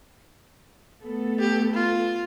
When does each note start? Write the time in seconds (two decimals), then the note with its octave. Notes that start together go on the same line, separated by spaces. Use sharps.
1.04 A3 B3 A4
1.40 G4
1.74 F4